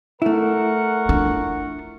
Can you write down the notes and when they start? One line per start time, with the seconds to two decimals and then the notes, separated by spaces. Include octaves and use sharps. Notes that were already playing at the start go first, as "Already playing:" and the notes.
0.22 A3 E4 A#4 F#5 C#6
1.09 D4 F4